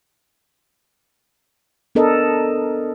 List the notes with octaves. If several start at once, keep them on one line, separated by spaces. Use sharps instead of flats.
B3 D4 A4 A#4 D#5